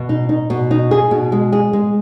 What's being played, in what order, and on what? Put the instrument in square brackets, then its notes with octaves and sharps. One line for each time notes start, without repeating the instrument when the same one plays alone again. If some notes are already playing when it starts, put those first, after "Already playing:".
Already playing: [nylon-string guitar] B2
D#4
D#4
B2
D#4
G#4
B2
G#3
G#4
G#3